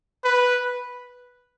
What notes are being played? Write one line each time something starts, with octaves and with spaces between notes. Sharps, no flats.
B4